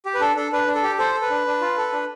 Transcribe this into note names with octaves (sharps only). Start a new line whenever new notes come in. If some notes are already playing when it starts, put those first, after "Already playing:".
G4
B4
D4 A4
D4 A4
D4 B4
D4
A4
G4
A4 C5
A4
B4
D4
D4
F4
A4
D4